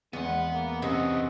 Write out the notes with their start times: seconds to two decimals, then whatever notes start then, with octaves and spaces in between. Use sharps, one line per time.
0.13 E2 G#3 B3 F#5
0.53 A#3
0.82 C3 B3 C#4 D#5